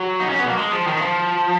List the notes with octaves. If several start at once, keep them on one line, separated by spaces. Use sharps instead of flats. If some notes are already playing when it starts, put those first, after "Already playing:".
Already playing: F#3
D#4
C#4
B3
A#3
G#3
F3
D#3
F3